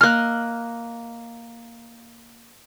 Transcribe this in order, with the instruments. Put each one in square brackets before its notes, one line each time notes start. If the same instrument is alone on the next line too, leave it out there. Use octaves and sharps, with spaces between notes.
[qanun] A#3 D#5 [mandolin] F6 F#6